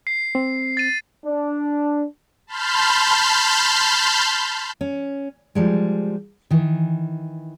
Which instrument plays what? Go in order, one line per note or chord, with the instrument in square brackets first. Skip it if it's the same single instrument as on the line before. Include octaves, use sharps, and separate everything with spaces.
[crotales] C7
[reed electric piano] C4
[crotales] A6 D#7
[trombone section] D4
[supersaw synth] A5 B5 C6 F6 G6
[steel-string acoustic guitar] C#4
F3 G3 G#3
D#3 E3